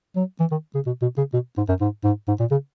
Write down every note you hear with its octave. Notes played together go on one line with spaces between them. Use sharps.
F#3
E3
D#3
C#3
B2
B2
C#3
B2
G#2
F#2
G#2
G#2
G#2
A#2
C#3